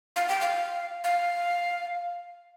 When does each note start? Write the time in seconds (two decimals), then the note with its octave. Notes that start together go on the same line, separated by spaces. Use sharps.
0.16 F5
0.28 G5
0.41 F5
1.04 F5